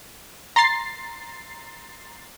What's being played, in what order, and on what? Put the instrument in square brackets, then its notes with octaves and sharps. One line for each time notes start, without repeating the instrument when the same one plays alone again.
[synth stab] A#5 C6 A6 C7